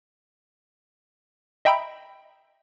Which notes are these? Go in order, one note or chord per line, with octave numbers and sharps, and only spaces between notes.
D#5 E5 G5 A#5 B5 D7